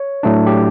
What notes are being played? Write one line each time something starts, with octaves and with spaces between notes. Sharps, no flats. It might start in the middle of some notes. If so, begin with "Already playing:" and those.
Already playing: C#5
A2 F#3 A3 D4
G4